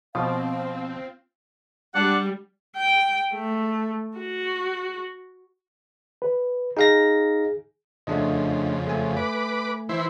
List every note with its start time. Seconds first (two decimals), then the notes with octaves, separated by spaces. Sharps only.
0.15 B2 F3 C4 F4 F5
1.95 G3 D4 D5 F#5
2.76 G5
3.34 A3
4.18 F#4
6.22 B4
6.77 D#4 G#4 F5 A#6
8.07 F2 C#3 A3 D4 D#5
8.87 A3 G#5
9.16 B4 D6
9.89 E3 E4 C5